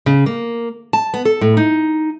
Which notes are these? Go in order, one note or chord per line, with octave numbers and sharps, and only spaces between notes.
C#3
A#3
A5
B3
A4
A2
D#4